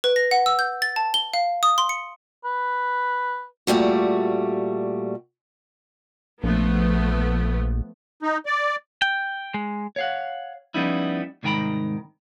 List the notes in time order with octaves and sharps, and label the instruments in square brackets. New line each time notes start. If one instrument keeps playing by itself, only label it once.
[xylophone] B4
A#6
F#5
E6
G6
A6
A5
G7
F5
D#6
C6
C#7
[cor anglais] B4
[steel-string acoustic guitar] A#2 G3 A3 F#4
[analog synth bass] A#1 [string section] F3 A3 B3
[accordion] D#4
D5
[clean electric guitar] G5
G#3
C#5 F5 F#5
F3 G3 B3 C#4 D#4 E4
C2 G#2 D#3 G5 A#5 B5